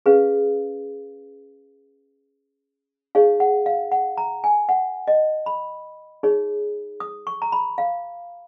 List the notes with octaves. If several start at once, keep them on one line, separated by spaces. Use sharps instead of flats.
C#4 G#4 B4 F5
D#4 G#4 C#5 F5
F#5
F5
F#5
A#5
G#5
F#5
D#5
B5
D#4 G#4 C#5
D#6
C#6
A#5
B5
F5